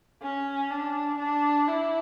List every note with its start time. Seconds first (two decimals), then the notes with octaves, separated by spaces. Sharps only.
0.23 C#4
0.71 D4
1.19 D4
1.68 E4